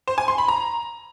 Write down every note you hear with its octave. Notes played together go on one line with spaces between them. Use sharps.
C5
G#5
C6
B5
A#5